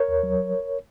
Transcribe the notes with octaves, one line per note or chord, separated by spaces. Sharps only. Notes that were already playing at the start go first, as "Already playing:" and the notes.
Already playing: A#4 C#5
D#2
F#3